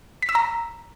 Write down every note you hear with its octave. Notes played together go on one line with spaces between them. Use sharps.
B6
E6
A#5